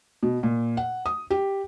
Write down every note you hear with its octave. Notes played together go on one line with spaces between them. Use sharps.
B2
A#2
F#5
D#6
G4